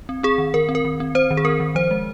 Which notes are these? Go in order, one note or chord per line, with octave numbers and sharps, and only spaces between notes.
C4
C4 G#4
D#3
D#3 A#4
C4
A#4
D#3
C4
C4 C5
D#3
G#4
C4 A#4
D#3
F3 C5
G#3